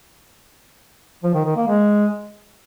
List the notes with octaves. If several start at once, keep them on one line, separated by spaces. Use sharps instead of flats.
F3
D#3
D#3
A#3
G#3